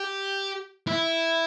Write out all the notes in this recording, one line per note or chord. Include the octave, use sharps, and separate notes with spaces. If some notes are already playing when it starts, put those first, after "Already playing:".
Already playing: G4
E4